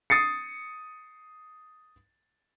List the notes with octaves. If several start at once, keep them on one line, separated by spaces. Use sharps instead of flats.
D#6 A6 C7 C#7